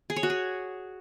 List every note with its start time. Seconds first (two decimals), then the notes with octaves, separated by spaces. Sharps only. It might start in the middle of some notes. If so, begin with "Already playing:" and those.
0.10 G#4
0.16 C#5
0.23 F#4
0.30 G#4